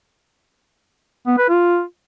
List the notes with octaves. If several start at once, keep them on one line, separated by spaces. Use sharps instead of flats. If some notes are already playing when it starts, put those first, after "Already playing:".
B3
B4
F4